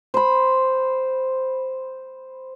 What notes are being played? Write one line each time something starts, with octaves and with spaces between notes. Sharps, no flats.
C5 B5